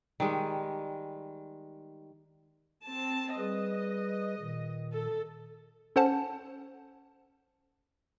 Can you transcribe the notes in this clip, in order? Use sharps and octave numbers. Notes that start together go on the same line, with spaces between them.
D#3 G3 G#3
C4 A5
G3 G#4 B4 D#5
A#2 D#3
A4
C#4 A4 C5 F#5 A5